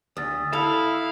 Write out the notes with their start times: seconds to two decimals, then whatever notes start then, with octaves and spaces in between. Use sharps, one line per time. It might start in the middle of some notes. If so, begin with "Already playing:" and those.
0.17 D2 D#6 A6
0.53 E4 A4 F5